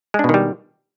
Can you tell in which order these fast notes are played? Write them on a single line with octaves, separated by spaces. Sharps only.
G#3 D4 B2 D#3 G3